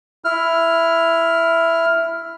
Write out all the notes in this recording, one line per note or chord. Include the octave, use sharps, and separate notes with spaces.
E4 F6